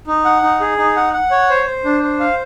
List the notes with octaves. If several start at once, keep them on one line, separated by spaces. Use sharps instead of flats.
D#4
F#5
D#4
G#4
D#4
F#5
F#5
C#5
C5
C5
D4
C5
F5